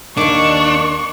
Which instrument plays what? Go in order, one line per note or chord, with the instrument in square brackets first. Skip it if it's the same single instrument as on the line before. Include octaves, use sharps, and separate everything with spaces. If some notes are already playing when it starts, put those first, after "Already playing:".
[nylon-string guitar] D#2 D#3 [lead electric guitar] D4 [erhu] C#6 [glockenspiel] D6